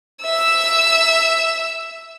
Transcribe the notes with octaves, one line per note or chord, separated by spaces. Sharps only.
E5 E6